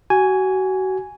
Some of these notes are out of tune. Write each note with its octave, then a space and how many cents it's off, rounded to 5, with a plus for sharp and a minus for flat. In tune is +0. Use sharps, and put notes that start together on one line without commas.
F#4 +30 G#5 +0